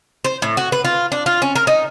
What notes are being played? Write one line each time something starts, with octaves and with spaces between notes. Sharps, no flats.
C5
A2
F#4
B4
F4
D4
F4
C#4
A#4
D#4